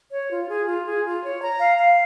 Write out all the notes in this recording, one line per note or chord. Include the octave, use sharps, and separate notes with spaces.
C#5
F4
G#4
F4
G#4
F4
C#5
A#5
F5
F5